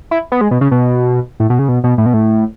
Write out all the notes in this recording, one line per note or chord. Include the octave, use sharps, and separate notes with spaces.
E4
B3
G#3
B2
C#3
B2
A2
B2
C#3
B2
B2
A2
B2
A2